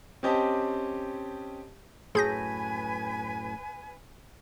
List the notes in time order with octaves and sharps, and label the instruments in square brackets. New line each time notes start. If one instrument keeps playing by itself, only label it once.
[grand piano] C4 C#4 G4 D#5 A5
[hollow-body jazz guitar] F#2 A2 C6 [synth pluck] G#4 G6 A#6 [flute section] B4 G#5